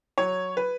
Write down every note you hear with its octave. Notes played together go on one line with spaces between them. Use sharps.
F#3 C#5
B4